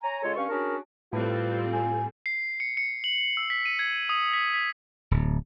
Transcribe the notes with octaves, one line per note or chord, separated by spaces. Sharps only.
C#5 G#5 A#5
C#3 G#3 F4 A4 C#5
G2 C#4 F5 C#6
C#4 D4 F#4 G#4 A#4
A2 G3 C4 F4 A4 B4
G#5
C7
C#7
C#7
F#7
E6
B6
D#7
G#6
D#6
B6
B6
D1